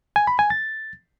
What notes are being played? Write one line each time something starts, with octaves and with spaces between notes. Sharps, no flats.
G#5
B5
G#5
A6